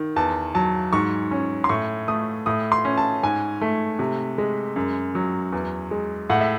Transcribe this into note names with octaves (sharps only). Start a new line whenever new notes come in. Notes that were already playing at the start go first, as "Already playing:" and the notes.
Already playing: D#3
E2 A5
F#3 A5
G#2 C#6
C#4
C6
A2 C#6
A3 D#6
A2 D#6
C6
C#4
A5
G#2 G#5
A3
C3
G#3
F#2
F#3
E2
G#3
A2 F#5
E5